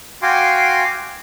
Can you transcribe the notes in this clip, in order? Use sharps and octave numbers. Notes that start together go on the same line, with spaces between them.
F#4 F5 G5 G#5 C6 D6